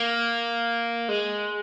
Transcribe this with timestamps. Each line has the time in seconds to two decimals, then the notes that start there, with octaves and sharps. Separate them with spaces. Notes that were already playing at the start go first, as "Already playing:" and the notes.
Already playing: A#3
1.09 G#3